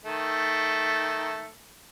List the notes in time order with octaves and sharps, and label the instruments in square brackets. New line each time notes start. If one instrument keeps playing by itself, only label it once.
[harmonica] D#3 A3